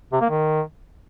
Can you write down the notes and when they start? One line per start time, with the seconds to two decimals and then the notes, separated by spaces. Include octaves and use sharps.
0.12 C3
0.21 A#3
0.30 D#3